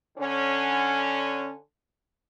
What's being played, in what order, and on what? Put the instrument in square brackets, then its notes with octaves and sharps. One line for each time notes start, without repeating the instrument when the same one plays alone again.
[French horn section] D3 C#4